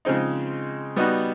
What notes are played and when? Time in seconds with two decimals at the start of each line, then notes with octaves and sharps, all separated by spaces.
0.05 C#3 F3 G#3 C4 D#4
0.96 G3 B3 D#4 F#4